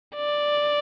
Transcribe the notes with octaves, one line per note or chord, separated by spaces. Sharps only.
D5